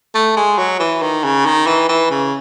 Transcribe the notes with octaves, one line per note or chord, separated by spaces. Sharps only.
A3
G#3
F#3
E3
D#3
C#3
D#3
E3
E3
C#3